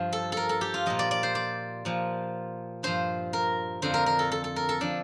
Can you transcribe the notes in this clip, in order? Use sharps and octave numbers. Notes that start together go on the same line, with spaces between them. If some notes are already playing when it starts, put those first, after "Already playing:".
Already playing: G2 F3
A4
A4 A#4
A4
G4
F4
A#2 F3 D#5
D5
D5
C5
D5
A#2 F3
G2 F3 C5
A#4
F2 D3 F3 C5
A#4
A#4
A4
A4
A4
A#4
A4
F3 D4